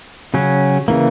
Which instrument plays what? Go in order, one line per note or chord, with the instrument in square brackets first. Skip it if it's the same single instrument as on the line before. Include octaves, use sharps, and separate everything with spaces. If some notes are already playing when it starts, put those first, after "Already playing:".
[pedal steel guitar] C#3 F#3 C#4
C#3 E3 A#3